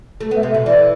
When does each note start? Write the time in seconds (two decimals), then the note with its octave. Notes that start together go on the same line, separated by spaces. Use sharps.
0.20 A3
0.31 B3 E5
0.43 C3
0.51 E5
0.54 B2
0.66 E3 D5